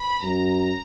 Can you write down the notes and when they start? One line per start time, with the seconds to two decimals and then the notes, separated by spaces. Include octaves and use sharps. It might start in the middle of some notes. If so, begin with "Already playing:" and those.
Already playing: B5
0.22 F#2 A#5